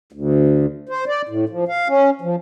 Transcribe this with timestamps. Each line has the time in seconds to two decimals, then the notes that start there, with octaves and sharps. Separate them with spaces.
0.12 D2
0.89 C5
1.08 D5
1.29 A2
1.49 F3
1.68 F5
1.88 C#4
2.21 F3